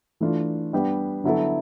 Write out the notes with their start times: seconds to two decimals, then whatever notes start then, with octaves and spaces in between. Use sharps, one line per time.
0.20 E3 A3 D4 F4
0.73 G3 B3 D4 G4
1.24 D3 F#3 B3 E4 A4